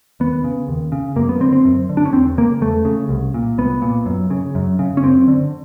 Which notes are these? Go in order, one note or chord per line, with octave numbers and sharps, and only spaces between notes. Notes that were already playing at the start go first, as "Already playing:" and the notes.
D#2 B3
C#3
D#2
C#3
F#2 A#3
B3
D3 C4
C4
F#2
D3
D4
C#4
E2 C4
C#3 A#3
E2 A3
C#3
C2
A#2
C2 B3
A#2
F#2
C#3
F#2
C#3
C#4
F#2 C4
D3